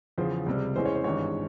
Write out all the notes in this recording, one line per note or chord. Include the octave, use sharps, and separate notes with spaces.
E2 C#3 F3 C5
C#2 C3 G3
E2 E3 G#3 C#4 C5
C#5
C5
G#1 G2 E3 G#3 C#5